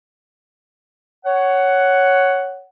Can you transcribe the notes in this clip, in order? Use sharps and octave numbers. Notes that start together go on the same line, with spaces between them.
C#5 F#5